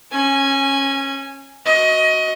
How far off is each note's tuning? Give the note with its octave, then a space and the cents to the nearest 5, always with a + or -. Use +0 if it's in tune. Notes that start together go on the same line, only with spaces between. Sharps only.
C#4 -20 G#5 +0
F#4 +0 D#5 +25